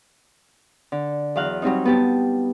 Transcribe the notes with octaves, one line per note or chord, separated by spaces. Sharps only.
D3
E2 F#3 F5 F#6
F#3 G3 C4 D#4
B3 G4 A5